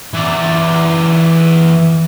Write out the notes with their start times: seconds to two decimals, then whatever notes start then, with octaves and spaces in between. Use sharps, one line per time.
0.13 E3 D5